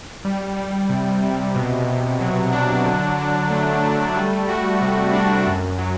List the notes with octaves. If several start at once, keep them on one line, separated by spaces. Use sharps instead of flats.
G3
G3
C3
C3
B2
B2
F#3
D4
D3
F#3
A3
A3
G3
F#4
C3
D4
F#2
F#3